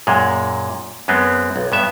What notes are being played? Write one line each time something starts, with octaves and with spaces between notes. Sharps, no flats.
F#2 A#2 G#3
F#2 G#3 B3 C4
B1
G2 B3 E5